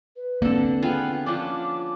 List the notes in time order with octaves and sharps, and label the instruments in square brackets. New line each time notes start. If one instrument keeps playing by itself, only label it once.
[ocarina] B4
[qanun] D3 A4 [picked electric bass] A#3 C4
[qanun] B3 F4 G#4 [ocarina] G5
[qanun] F3 C#4 D4 [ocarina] D6